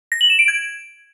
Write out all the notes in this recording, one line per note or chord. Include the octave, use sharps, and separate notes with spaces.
A#6
F#7
E7
D7
G#6